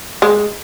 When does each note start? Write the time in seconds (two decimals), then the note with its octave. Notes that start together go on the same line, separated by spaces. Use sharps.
0.22 G#3